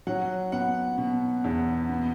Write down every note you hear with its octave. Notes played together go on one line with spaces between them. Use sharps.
F#3 F#5
B3 F#5
B2
E2
B3